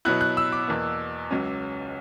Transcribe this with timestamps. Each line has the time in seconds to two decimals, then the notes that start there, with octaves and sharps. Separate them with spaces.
0.05 B2 F#3 B3 E4 F#6
0.21 F#6
0.37 E6
0.52 D6
0.68 E2 B2 A#3
1.31 C#2 C#3 F#3 C#4